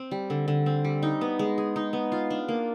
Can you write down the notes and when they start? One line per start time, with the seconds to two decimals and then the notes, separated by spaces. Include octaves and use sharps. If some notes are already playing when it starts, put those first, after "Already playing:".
Already playing: C4
0.11 G3
0.30 D3
0.48 D3
0.66 C4
0.85 G3
1.03 D#4
1.21 B3
1.39 G#3
1.58 G#4
1.76 D#4
1.93 B3
2.12 F4
2.30 D4
2.48 A#3